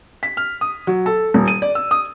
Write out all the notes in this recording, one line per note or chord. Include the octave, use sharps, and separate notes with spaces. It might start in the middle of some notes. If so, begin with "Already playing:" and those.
B6
F6
D#6
F#3
A4
D#1
D#7
D5
E6
D#6